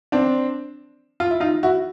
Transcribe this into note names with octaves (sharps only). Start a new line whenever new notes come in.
C4 D4
F4
E4
D#4 F4
E4 F#4